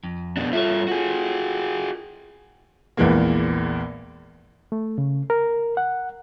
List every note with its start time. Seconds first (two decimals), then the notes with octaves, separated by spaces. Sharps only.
0.03 F2
0.37 B2 D4
0.53 G2 F4 A4 C#5 E5
0.88 F#4 G#4
2.97 A#1 E2 A#2 E3 G#3 A#3
4.72 A3
4.98 C#3
5.30 A#4
5.77 F#5